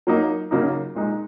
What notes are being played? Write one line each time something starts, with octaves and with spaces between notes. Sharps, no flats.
F#3 A#3 D#4
C#3 F#3 A#3 D#4
A#2 G#3 D#4